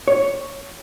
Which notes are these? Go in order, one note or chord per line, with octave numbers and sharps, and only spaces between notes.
C#5